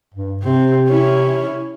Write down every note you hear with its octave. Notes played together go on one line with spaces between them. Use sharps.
G2
C3 C4
C#4 E4